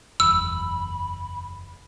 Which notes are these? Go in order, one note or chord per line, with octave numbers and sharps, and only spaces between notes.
F#1 E2 B5 E6